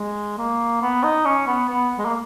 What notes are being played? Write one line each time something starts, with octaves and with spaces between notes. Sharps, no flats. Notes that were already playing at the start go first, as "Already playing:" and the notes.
Already playing: G#3
A#3
B3
D#4
C#4
B3
B3
G#3
A#3